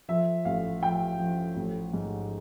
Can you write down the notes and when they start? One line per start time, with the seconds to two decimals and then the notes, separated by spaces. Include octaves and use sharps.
0.09 F3 E5
0.45 A1 F5
0.82 F3 G5
1.19 F3
1.56 A1
1.93 G#2